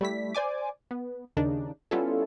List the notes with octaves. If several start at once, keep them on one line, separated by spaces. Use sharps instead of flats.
G3 A3 E4 B6
C5 D5 G#5 D6
B3
D#2 C#3 D4 D#4
G3 B3 C#4 E4 F4 A4